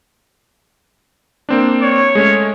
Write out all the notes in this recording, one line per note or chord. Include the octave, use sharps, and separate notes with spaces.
A#3 C4 D4
C#5
G#3 A3 C#4